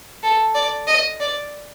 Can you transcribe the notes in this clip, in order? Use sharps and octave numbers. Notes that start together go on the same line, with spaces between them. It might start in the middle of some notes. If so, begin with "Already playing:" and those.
A4
D5
D#5
D5